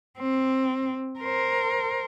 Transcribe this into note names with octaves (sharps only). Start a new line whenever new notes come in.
C4
A#4 C5